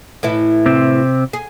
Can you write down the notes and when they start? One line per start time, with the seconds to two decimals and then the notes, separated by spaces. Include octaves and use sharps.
0.23 A2 E3 E4
0.66 C3 C4
1.33 G#4